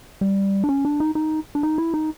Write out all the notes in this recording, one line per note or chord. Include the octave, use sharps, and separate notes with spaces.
G3
D4
C#4
D4
D#4
D#4
D4
D#4
E4
D#4